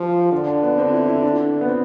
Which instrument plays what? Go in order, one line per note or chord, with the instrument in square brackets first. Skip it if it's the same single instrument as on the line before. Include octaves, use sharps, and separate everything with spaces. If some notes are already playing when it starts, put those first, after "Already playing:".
Already playing: [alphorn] F3 [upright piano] F4 G4
[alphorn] D3 [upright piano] D4
[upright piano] D4
B3
C4
E4
E4
D4
B3
C4